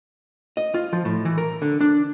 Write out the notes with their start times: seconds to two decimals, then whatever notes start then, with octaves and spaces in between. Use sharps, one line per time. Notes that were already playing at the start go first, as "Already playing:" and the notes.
0.57 D#5
0.74 F4
0.93 F3
1.05 A2
1.25 E3
1.38 A#4
1.62 D3
1.80 D4